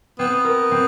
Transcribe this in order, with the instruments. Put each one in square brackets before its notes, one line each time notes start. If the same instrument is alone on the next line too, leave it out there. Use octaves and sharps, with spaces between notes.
[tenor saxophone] B3 [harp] C4
[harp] A#4
C4